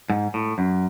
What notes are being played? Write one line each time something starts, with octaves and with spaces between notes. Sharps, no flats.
G#2
A2
F#2